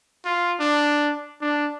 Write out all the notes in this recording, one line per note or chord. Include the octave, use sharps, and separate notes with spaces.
F4
D4
D4